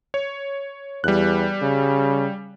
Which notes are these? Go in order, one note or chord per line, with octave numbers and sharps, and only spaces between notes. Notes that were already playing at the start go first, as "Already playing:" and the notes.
C#5
E2 G3 F#6
C#3